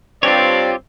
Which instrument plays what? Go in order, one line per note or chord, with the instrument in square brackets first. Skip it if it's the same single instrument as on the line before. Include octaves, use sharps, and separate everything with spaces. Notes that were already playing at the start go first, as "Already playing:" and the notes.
[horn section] G2 C4 D5 [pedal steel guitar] F4 G4 C#5